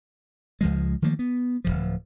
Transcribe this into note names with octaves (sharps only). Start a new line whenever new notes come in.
C#2 F3 G#3
D#3 F3 A3 A#3
B3
D1 B1 F3